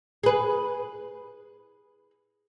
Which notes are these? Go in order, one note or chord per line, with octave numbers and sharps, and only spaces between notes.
G#4 B4